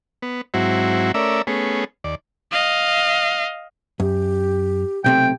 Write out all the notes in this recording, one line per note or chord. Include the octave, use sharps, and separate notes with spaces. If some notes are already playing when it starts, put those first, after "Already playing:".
B3
G#2 F#3 C4 E4 F#4
A3 C#4 A#4 D5 E5 E6
A3 B3 C#4 G#4
D#2 D5
D#5 F5
F#2 G4
B1 C3 A3 G5